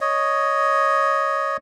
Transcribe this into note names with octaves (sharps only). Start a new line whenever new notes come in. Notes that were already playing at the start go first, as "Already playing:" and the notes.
C#5 D#5